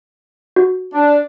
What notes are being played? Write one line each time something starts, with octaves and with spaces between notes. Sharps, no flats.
F#4
D4